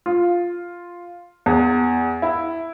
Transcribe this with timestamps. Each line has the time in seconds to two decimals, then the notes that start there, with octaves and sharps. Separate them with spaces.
0.06 F4
1.46 E2
2.22 E4